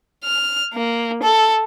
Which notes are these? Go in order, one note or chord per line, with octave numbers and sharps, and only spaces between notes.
F6
A#3
A4